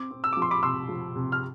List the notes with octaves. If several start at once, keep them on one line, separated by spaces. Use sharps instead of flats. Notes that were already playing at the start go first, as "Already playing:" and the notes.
Already playing: C4 D6
C4
E6
D6
F3
C6
B5 D6
C3 C6 E6
F3
C3
F6